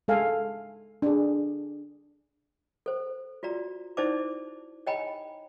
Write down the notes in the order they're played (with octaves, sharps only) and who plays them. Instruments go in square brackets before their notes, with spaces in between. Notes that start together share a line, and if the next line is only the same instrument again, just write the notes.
[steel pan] G#3 A4 F5 G#5
D4 G#4
[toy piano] A4 C5
F4 F#4 D5 A#5
D#4 E4 C5 D5 A5 D6
C#5 D#5 G5 G#5 A#5 B5